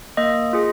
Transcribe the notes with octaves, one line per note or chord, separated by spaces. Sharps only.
A#3 D#5
F4 G#4